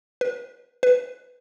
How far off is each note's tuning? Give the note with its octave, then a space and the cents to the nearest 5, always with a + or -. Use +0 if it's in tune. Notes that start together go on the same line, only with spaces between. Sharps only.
B4 -35
B4 +0